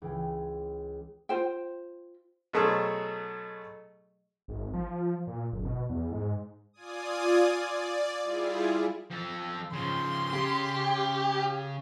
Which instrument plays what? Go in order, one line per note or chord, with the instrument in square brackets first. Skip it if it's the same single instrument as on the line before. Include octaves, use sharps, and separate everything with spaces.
[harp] C#2 E3 G5
[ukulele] F4 C5 G5
[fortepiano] B2 F#3 A3 G#4 C5 A5
[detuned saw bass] G#1
F3
A#2
F#1
B2
E2
G#2
[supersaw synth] F4 D5 G#5 D#6
D5
G3 E4 F4 G#4
[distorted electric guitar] F3 A4
[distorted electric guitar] C#3 F3 [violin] C6
[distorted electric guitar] C#3 [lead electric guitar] G4